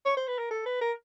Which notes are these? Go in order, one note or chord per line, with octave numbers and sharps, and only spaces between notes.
C#5
C5
B4
A#4
A4
B4
A#4